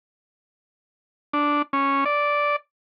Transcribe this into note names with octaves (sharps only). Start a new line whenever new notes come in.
D4
C#4
D5